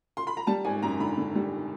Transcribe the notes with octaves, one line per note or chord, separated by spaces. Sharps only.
C6
B5
A#5
G3 A5
G#1 G#5
F#2 A#5
D3 B5
D3
G3